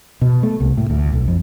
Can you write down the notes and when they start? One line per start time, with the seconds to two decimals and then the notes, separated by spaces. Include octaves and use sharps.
0.21 B2
0.43 A3
0.60 C2
0.77 A2
0.90 D2
1.12 B1
1.28 F2